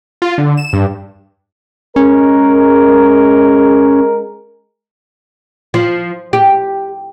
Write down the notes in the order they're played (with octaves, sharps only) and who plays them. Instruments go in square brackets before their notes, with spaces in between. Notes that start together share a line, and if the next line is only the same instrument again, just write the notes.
[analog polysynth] F4
D3
E7
G2
[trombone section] G#3 A#4 [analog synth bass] C#4
[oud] F3
G4